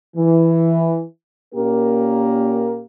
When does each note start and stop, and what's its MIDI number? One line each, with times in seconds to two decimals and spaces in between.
0.16 1.02 52
1.54 2.82 46
1.54 2.82 58
1.54 2.82 61
1.54 2.82 67
1.54 2.82 70